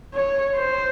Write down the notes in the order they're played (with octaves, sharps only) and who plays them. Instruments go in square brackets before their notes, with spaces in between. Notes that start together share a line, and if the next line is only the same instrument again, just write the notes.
[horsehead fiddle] C#5
C5